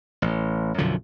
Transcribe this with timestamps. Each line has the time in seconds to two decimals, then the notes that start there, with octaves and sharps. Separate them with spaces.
0.22 A1
0.78 B1 F#2 D3 F3